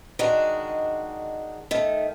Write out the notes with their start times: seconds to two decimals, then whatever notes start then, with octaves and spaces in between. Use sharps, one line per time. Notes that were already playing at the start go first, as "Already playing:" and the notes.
0.19 D#3 G#3 D4 F#4
1.71 D#3 A3